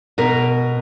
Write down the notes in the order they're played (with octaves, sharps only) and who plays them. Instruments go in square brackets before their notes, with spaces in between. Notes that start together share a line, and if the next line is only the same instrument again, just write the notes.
[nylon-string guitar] B2 A#4